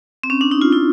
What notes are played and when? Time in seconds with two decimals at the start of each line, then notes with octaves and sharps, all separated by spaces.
0.24 C4
0.30 C#4
0.41 D4
0.51 D#4
0.61 F4
0.72 E4